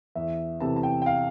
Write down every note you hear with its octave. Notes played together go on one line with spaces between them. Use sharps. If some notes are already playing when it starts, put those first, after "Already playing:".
E2 E5
C3 E3 A3 A5
A5
G5
G5
F5